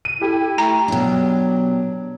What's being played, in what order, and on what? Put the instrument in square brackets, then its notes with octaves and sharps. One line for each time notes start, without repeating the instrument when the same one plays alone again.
[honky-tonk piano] D#7
[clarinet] E4 [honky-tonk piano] G4 A4
[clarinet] A3 [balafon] A#5
[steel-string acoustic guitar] B2 D4 [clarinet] F#3